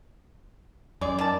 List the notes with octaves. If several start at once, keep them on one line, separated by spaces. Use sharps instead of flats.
F#2 G#3 D5
D#3 A5